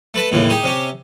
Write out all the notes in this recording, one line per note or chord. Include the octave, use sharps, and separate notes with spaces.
A3 B4 A5
D#2 A2 C#3 E3
D#4 G4 G#4
C3 C#4 G4